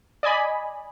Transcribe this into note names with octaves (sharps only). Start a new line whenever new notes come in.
D5 D#5 G#5 B5